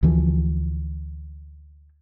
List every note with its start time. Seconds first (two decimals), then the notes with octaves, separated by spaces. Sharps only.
0.03 D2 E3 F3